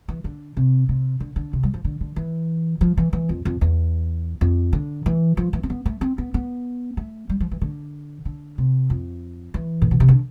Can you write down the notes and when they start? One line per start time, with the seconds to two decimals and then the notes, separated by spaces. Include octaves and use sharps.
0.08 E3
0.24 D3
0.57 C3
0.89 C3
1.20 D3
1.36 D3
1.53 C3
1.63 G3
1.74 F3
1.84 D3
2.01 D3
2.16 E3
2.81 F3
2.97 E3
3.13 E3
3.29 F2
3.45 F2
3.61 E2
4.41 F2
4.73 D3
5.06 E3
5.37 F3
5.53 E3
5.63 C4
5.70 B3
5.86 A3
6.01 C4
6.18 B3
6.34 B3
6.97 A3
7.29 G3
7.40 F3
7.51 E3
7.61 D3
8.25 D3
8.58 C3
8.90 F2
9.54 E3
9.82 A2
9.91 B2
10.00 C3
10.08 D3